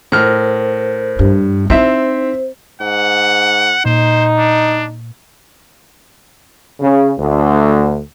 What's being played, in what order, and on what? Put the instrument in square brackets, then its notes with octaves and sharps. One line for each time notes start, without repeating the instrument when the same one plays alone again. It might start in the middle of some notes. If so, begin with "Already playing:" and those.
[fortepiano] A2 F6 [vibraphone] A#4 C5
[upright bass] G2
[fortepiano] C4 E5 [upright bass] D#4 E4 [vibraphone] C5
[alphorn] G#2 [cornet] F#5
[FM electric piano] A#2 [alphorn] D#4 [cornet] C5
[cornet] D4
[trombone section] C#3
D2